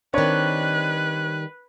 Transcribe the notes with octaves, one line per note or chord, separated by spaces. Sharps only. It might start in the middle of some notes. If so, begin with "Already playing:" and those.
D#3 G3 C4 D4 B4 C#5 F#6